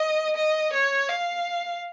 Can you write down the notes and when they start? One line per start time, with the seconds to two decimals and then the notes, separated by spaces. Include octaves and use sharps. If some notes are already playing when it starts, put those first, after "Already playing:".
Already playing: D#5
0.36 D#5
0.72 C#5
1.09 F5